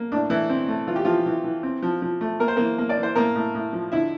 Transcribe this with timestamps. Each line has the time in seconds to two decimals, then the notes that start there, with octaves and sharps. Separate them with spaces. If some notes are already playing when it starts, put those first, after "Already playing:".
Already playing: A#3
0.12 A2 D4
0.30 E3 A3 E4
0.49 C4
0.68 A3
0.88 E3 F4
0.96 G4
1.05 E3 F3 F4
1.26 E3
1.44 E3
1.63 C4
1.82 F3
2.02 F3
2.21 A3
2.40 A#3 A#4
2.48 C5
2.56 E3 A#3 A#4
2.78 A#3
2.89 D5
2.97 E3
3.03 C5
3.15 A2 A#3 A#4
3.35 A2
3.55 A2
3.73 F3
3.92 D3 E4 E5